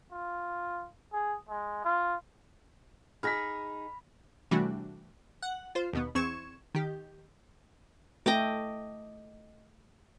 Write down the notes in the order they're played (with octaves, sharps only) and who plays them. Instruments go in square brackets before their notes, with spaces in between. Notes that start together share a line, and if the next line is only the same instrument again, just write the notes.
[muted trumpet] F4
G#4
G#3
F4
[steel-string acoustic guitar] D#4 G#4 [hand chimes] B5 [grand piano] F6 A#6 B6
[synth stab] C3 E3 G3 A3 D4 F#4
F#5
F4 C5
D#2 B2 B3
E2 C4 C#6 G#6 E7
D#3 G4
[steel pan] A3 [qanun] D#5 G5 D6